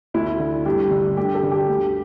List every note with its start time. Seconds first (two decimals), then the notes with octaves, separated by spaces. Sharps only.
0.14 D2 E4
0.40 D3
0.66 G2 G4
0.91 D3
1.17 D2 G4
1.35 A4
1.43 D3
1.51 G4
1.69 D2